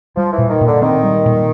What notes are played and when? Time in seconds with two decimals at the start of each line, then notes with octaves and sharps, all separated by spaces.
0.16 F3 G3
0.33 E3
0.38 A#2
0.49 D#3
0.61 A#2
0.66 D3
0.82 D#3 C4
1.04 G3
1.25 A#2